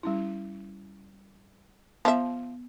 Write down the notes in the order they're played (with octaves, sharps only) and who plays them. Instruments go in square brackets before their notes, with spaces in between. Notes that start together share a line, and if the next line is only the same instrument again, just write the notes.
[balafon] G3 C#4 E4
[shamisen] F3 E5 [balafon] B3